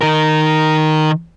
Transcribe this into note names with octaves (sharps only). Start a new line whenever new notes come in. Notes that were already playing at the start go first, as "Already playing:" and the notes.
D#3 A#4